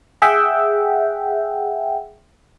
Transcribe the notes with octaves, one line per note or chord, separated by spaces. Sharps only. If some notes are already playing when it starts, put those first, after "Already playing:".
G#4 E5 F#5 G5